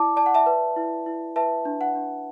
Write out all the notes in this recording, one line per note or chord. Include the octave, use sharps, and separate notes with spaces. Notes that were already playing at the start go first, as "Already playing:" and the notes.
Already playing: E4 D5 A5 D6
D5 A5
F#5
E5 A5
B4
E4
E4
B4 E5 A5
D4
F#5
D4